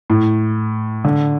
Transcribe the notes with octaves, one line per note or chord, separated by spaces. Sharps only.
A2
D3